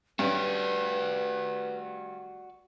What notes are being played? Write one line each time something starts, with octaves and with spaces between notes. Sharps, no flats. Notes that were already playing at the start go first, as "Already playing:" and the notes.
G2 C#4 F#4 B4 D5